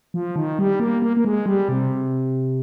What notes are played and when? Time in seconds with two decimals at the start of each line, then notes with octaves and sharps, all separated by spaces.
0.14 F3
0.36 D#3
0.59 G3
0.80 A#3
1.02 A#3
1.17 A#3
1.25 G#3
1.46 G3
1.69 C3